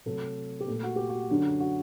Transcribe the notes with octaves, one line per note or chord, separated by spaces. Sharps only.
C3 F#3 A3 A4
G4
A#2 A3 A4
F#4
G4
F#4
F#2 D3 F#3
F#4